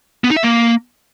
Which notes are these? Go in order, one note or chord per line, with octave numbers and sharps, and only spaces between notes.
B3
D#4
E5
A#3